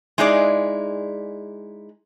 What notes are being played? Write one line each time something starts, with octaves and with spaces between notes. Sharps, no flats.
G#3 D#4 E4 G#4 A4 D5